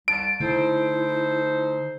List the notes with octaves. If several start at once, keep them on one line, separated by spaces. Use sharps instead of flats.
C2 A5 D7
D3 A3 D#4 E4 A4 C5